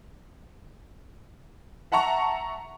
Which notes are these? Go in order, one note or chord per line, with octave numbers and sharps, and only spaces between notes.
E5 F#5 A5 A#5 C#6